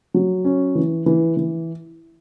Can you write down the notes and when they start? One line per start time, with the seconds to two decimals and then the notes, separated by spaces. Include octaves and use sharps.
0.14 F#3
0.45 C#4
0.75 E3
1.06 E3
1.37 E3